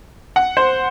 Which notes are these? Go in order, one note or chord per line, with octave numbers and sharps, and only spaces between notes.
F#5
C5